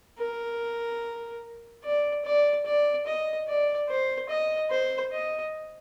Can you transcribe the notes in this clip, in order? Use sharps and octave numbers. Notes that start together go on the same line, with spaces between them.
A#4
D5
D5
D5
D#5
D5
C5
D#5
C5
D#5